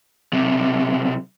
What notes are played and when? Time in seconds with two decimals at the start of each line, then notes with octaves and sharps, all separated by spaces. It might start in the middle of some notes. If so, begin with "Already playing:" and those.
0.33 B1 C3